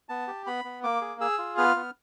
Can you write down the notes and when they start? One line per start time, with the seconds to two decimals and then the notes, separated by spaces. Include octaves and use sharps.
0.09 B3 A5
0.28 G4
0.46 B3 B5
0.65 B3
0.83 A#3 D6
1.01 G#4
1.20 G#4 E6
1.38 F4
1.58 B3 F6
1.76 B3